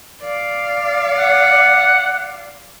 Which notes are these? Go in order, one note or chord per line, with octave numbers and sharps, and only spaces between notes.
D5 F5
F#5